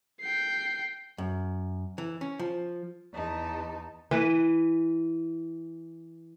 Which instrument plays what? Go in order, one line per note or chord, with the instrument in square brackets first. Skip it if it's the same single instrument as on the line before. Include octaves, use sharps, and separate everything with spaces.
[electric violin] G5 C7
[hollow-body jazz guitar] F#2
E3
C#4
F3
[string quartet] E2 D#4 A5
[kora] E3 B4